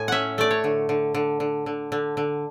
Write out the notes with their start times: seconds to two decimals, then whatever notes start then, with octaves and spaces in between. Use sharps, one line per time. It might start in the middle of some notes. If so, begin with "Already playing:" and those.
Already playing: A2 G#5
0.08 C#4 E5 F#5
0.38 A3 D5
0.51 C#5
0.64 D3
0.89 D3
1.14 D3
1.40 D3
1.66 D3
1.92 D3
2.17 D3